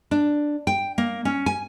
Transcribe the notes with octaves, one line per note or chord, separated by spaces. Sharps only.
D4
G5
A#3
C#4
G#5